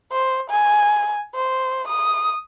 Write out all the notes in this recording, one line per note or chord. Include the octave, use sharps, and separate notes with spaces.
C5
G#5
C5
D#6